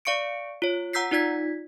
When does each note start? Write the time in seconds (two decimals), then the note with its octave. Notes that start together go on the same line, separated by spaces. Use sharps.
0.05 D5 F5 C#6 C#7 D7
0.62 F4 C#5
0.93 F#5 A#5 E6 G6 B6 C7
1.11 D#4 F4 D5 G#6 B6